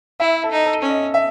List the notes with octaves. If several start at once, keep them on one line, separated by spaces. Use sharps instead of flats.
E4 E5
A4
D#4
A4
C#4
D#5
E5